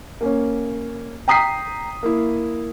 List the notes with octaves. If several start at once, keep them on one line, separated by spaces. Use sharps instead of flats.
A#3 C#4 C#5
G5 A#5 D#6 B6 C7
A#3 E4